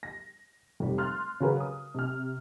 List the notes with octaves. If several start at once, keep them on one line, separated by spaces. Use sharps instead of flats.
A#6
F1 G3
C6 F6 F#6 A6
C#3 F#3 F#4 G#4 A#4 B4
D#6
C3 F6